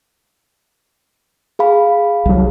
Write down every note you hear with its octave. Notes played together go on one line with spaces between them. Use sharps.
G#4 F5 B5
C2 F#3